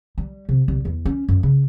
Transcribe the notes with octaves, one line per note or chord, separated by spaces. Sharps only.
G3
C3
C2
E2
C#4
F#2
C#3